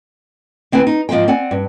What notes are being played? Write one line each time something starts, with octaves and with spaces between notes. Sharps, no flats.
D2 C4 E4 B4 G#5
D#4
G#2 F3 C4 C5 G5
C4 D5 F#5 G#5
G2